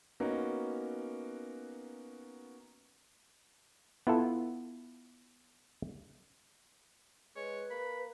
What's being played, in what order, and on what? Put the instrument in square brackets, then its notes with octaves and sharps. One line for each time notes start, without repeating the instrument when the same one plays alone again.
[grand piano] A#3 B3 C#4 D#4 F#4
[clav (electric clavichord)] B3 E4 F4 A4
[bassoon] G#3 [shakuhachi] B4 [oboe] C#5
[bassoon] A#3 [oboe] B5